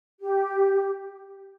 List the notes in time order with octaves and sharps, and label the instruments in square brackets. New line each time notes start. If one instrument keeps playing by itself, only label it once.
[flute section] G4